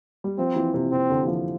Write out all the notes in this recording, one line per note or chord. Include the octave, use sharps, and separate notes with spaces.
G3
F3 C4
E3
C3
C3 C4
D3
E3
F3